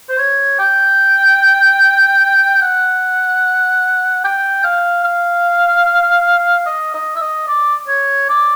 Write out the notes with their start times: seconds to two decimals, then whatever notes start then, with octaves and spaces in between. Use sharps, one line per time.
0.09 C5
0.18 C#5
0.59 G5
2.62 F#5
4.24 G5
4.64 F5
5.04 F5
6.66 D#5
6.94 D#5
7.16 E5
7.22 D#5
7.48 D5
7.88 C#5
8.29 D5